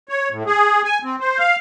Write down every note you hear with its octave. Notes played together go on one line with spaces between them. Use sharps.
C#5
A2
G#4
G#5
C4
C5
F5